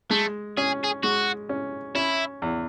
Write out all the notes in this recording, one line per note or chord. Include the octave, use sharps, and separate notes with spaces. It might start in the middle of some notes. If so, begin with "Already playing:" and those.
G#3 A3
C#4 G#4
G#4
G#3 F#4
C#4
C#4 E4
E2